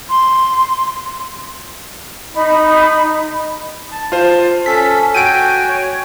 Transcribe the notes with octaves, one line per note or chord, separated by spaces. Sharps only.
C6
D#4 B5
A5
F4 C5
C#4 A4 B6
F#4 G5 G#5 D7 D#7
C#5